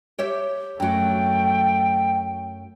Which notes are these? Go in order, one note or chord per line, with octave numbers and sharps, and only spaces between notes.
G4 C#5 E5
F#2 F#3 A3 G5